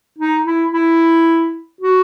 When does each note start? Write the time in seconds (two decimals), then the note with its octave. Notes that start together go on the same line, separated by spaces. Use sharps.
0.18 D#4
0.46 E4
0.72 E4
1.81 F#4